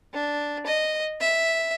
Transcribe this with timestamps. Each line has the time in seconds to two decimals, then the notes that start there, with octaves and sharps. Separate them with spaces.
0.14 D4
0.66 D#5
1.20 E5